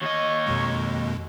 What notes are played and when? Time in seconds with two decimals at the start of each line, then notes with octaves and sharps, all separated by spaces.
0.02 D#2 C#5 D#5
0.47 F2 B2 G#3